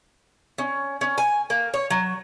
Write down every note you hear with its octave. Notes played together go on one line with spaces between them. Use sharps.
C#4
C#4
G#5
A#3
C#5
F#3